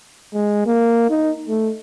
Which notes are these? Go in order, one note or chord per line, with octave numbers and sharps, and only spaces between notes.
G#3
A#3
D#4
A3